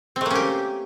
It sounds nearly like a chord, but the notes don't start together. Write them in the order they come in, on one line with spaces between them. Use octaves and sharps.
C4 A3 A#3 C#4 G4